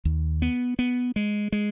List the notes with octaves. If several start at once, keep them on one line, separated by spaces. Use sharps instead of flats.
D#2
B3
B3
G#3
G#3